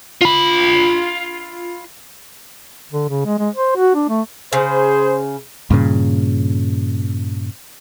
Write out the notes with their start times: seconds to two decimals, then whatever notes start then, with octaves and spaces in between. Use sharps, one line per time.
0.21 F4 B5
2.93 D3
3.09 C#3
3.26 G#3
3.39 G#3
3.54 C5
3.76 F#4
3.95 D4
4.09 A3
4.53 C#3 G#4 C5
5.71 G2 A#2 C#3